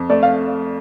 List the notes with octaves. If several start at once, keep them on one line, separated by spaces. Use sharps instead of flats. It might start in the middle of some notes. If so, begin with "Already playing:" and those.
Already playing: F2
A3 D5
F5